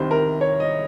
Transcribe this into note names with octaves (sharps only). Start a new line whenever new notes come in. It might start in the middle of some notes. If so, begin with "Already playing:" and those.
Already playing: C2 C3 D#3 C5
A#4
C#5
D#5